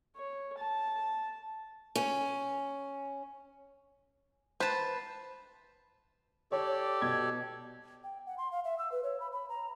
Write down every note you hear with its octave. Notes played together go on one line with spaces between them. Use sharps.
C#5
A5
C#4
B4 C5 A5
G4 A4 C#5 D5
B2 G#6
G5
F#5
C6
F5
E5
E6
B4
C#5
B5
B5
A#5